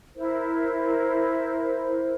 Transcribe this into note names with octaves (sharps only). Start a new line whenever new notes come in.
E4 A#4 C5